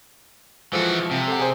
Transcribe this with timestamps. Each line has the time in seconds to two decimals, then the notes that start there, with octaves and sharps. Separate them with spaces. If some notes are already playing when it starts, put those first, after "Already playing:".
0.73 E3 F3 G#3 F#4 A4
1.11 C3
1.28 A4 F#5
1.39 G#4 C5